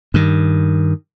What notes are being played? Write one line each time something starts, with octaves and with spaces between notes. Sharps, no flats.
G2 D#3